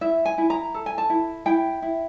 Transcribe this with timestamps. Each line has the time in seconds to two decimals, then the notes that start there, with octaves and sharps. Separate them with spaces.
0.01 E4 E5
0.25 G#5
0.38 E4
0.50 A#5
0.74 A4
0.86 G#5
0.98 A5
1.10 E4
1.46 E4 G5
1.82 E4